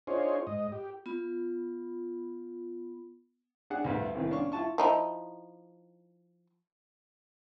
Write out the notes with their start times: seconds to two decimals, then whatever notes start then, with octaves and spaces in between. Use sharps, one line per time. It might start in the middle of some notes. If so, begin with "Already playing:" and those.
0.07 D4 D#4 F4 G#4 C5 C#5
0.47 G#2 D#5
0.72 G4
1.06 B3 F4 B5
3.70 D4 G#4 F#5
3.84 D2 G2 A3
4.15 C2 D#3 E3
4.30 C#4 D4 F5 C#6
4.52 E4 F4 A5 C#6
4.78 F3 D#4 E4